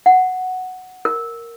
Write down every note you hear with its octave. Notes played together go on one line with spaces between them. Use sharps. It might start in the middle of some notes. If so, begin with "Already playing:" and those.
F#5
A#4